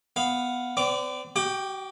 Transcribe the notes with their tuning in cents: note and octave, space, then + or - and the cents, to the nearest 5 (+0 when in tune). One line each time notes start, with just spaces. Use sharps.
B3 +0 F5 +0
C4 -45 D5 -30 D6 +0
F#4 +45 G5 +0 D6 +25